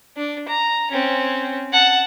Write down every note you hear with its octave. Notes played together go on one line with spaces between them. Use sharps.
D4
A#5
C4 C#4
F#5 A5